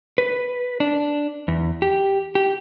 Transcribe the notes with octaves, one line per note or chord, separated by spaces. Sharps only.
B4
D4
E2
G4
G4